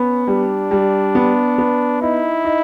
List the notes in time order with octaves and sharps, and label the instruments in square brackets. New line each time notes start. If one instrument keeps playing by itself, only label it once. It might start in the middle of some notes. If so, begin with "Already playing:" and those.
Already playing: [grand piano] B3 [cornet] C#4
[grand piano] G3 [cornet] D4
[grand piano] G3
B3
B3
[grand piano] D#4 [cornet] E4
[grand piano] D#4